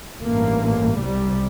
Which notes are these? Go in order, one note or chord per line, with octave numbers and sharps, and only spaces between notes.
A1 G2 A#3
C2 C3 G3